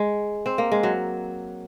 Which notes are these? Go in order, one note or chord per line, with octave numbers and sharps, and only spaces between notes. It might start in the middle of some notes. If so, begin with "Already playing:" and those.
Already playing: G#3
C4
A#3
G#3
F#3